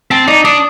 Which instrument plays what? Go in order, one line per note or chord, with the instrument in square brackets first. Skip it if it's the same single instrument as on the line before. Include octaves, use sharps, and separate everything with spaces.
[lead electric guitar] C4 [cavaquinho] A5
[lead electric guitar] D#4 [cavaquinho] D5
[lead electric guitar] D4 [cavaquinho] D#6